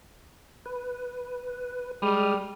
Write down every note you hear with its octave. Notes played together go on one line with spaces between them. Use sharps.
B4
G3 G#3 D#6 F6